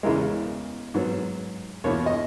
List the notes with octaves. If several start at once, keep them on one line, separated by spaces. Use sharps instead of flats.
E2 C#3 E3 G#3 A#4
G#2 F#3 B3
E2 B2 A#3 C#5
D#5